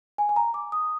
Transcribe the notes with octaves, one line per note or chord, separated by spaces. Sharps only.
G#5
G#5
A#5
D6
D#6